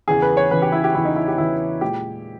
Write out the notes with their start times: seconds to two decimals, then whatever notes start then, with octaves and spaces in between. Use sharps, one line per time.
0.08 E2 C#3 E3 G#4
0.22 B4
0.37 C#5
0.51 E2 C#3 E3 B4
0.62 G4
0.72 E4
0.84 G4
0.94 E2 C#3 E3 E4
1.05 D#4
1.16 E4
1.28 G4
1.38 E2 C#3 E3 E4
1.81 A#2 G#3 G4